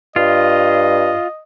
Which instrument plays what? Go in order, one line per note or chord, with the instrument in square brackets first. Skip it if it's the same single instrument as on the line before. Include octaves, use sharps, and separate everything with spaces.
[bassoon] G2 [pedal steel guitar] F4 [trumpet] D#5